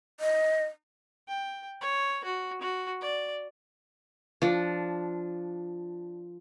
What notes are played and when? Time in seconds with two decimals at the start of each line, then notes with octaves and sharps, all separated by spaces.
0.20 D#5
1.28 G5
1.81 C#5
2.24 F#4
2.61 F#4
3.01 D5
4.42 F3 D4